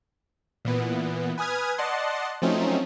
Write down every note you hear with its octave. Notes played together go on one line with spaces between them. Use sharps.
A#2 E3 B3
B4 G#5 D#6 F6 G#6
D5 D#5 F#5 A5 C6
F3 F#3 A3 C4 C#4 D#4